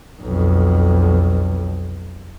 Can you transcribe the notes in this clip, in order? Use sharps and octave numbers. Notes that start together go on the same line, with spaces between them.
B1 F2